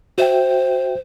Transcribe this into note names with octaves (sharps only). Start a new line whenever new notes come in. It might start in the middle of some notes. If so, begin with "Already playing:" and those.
F#4 C5 E5 G5